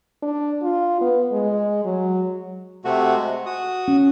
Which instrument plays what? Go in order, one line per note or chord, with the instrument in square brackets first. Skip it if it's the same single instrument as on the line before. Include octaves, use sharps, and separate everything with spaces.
[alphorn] D4
F4
B3
G#3
F#3
[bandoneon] C3 A3 F#4
G#3
F#4 D#6
[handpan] C#4